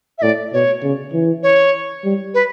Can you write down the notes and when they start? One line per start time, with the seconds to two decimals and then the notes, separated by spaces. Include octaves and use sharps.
0.18 E5
0.22 A2 D5
0.53 B2 C#5
0.83 C#3
1.13 E3
1.43 C#5
2.04 G3
2.34 B4